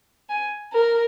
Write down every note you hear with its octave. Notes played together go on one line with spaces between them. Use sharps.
G#5
A#4